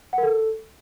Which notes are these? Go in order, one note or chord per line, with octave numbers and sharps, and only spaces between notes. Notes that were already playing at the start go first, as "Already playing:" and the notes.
F#5
A#4
A4